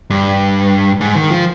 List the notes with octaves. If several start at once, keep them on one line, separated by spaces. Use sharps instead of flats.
G2
G#2
D#3
F3